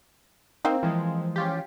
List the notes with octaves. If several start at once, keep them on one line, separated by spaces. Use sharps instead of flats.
A#3 C4 D#4 F5 G5
E3 F3 G#3
C#4 F4 G4